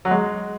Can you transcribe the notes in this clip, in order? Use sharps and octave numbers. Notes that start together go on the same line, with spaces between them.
F#3
G#3